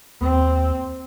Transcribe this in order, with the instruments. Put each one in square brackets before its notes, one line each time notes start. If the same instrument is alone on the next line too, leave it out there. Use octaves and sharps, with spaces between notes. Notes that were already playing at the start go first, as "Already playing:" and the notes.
[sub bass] D#2 [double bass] C4